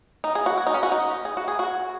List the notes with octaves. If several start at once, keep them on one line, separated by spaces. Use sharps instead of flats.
D#4
G#4
F#4
F#4
D#4
C#4
F#4
D#4
G#4
F#4
G#4
F#4